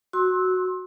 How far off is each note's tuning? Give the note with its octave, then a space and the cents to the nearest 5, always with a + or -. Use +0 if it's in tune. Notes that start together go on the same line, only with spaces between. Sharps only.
F#4 +0 C6 +25 E6 -20